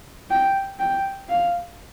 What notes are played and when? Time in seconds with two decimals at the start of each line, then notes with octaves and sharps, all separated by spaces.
0.30 G5
0.79 G5
1.29 F5